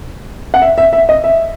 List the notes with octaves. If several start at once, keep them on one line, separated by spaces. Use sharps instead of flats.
F#5
E5
E5
E5
D#5
E5